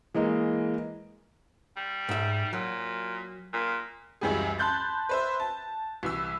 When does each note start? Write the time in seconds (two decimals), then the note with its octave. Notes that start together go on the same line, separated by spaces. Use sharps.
0.15 E3 G#3 A#3 D#5
1.77 G3
2.09 G#2 E5
2.53 A#2 F#3
3.53 A#2
4.21 C#2 F#2 E3 G3 G4 G#4
4.59 A5 B5 C6 F#6 G6 A6
5.09 B4 C5 E5
5.40 A5
6.03 C2 E3 E6